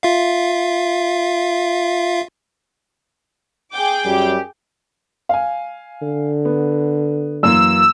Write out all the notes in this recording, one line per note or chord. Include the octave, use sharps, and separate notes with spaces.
F4 E5 F5
G#4 G5 D6
F#2 G3 G4
F5 G#5
D3
B3
F#2 E3 A#3 E6